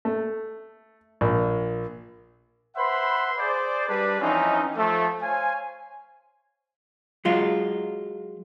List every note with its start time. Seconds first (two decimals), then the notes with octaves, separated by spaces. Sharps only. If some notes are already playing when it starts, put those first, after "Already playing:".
0.05 A3
1.21 A#1
2.76 B4 C5 E5 F#5 B5 C6
3.39 G#4 C5 D5
3.89 G3 D4 B4
4.20 E3 F3 C4 C#4 D#4
4.76 F3 A3
5.21 C5 C#5 F5 G#5
7.25 F#3 G#3 F4